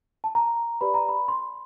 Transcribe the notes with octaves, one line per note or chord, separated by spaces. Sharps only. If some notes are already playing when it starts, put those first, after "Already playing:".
A5
A#5
G4 B4 D5 B5
A#5
B5
C6